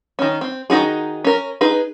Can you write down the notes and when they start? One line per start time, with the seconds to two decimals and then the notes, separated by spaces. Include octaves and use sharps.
0.19 D#3 C#4
0.41 C4
0.70 D#3 D#4 F#4 G#4
1.24 C#4 A#4
1.61 D#4 G#4 B4